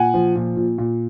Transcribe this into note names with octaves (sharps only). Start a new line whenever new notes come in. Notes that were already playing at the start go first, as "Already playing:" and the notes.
Already playing: A#2 F#5 G#5
F3
A#2
A#2
A#2